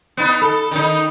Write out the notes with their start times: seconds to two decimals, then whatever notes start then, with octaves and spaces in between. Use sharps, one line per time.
0.17 B3 D#4
0.42 A4
0.71 D#3 D#4